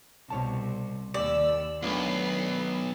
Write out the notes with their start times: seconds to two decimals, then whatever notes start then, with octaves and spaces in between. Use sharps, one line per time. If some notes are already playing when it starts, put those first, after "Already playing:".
0.30 C2 B2 C#5 A5
1.14 D#2 G4 D5 E6
1.83 B1 D#3 A3 D4 F4 B5 C7